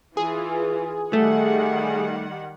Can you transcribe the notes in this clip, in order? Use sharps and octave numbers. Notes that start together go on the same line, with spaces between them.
E3 F4 G#4
D#3 G3 A3 F#5